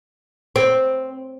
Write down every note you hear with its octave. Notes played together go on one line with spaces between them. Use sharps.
C4